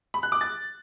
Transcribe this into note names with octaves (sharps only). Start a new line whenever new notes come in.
B5
F#6
D6
A6